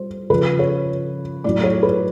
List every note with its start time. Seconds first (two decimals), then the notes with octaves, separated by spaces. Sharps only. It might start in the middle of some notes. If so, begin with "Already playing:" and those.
Already playing: G3 C5
0.30 C#3 F3 B4
0.59 C#5
1.44 A2 F#3 D5
1.64 C#5
1.83 B4